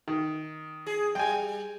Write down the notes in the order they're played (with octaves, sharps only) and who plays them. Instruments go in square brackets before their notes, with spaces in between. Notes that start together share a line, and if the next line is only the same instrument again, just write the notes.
[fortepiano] D#3
[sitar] G#4
[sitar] G3 [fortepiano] G5 G#5